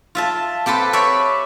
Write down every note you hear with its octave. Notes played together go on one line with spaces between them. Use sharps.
F4 E5 A5
C4 G4 A4 B4 C5
B4 C#5 D5 E5 B5